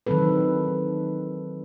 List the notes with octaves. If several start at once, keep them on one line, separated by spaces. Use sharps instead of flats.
D#3 E3 F#3 C4 A4 B4